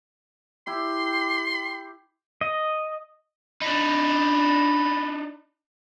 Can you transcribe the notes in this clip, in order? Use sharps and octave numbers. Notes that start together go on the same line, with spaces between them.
E4 G4 C6
D#5
D4 D#4 B5